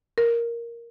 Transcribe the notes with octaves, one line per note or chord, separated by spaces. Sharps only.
A#4